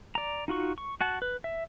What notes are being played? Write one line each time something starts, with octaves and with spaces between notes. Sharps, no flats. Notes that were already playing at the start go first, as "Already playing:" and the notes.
D5 A#5
D#4 F4 F#4 C#6
C#6
F#4 F#5 A5
B4
E5